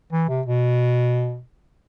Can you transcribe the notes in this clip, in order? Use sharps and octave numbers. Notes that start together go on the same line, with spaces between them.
E3
C3
B2